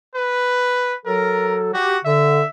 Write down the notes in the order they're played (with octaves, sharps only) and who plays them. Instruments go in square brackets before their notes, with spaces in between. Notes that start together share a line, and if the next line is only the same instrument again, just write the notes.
[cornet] B4
[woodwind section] F#3 A4 [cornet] A#4
[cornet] F#4 [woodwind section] G4
[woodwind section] D3 [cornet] E5